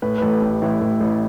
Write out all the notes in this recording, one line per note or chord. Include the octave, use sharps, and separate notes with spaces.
A2 B4
B4
A1 A4
A2 G4
A1 E4
A1
A1